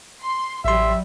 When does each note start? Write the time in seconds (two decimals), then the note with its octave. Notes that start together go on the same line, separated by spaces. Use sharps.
0.22 C6
0.65 A1 F#3 G3 E5 C6